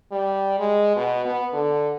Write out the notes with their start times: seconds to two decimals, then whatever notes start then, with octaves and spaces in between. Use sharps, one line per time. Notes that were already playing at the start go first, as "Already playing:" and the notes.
0.12 G3
0.59 G#3
0.96 B2
1.25 B3
1.54 D3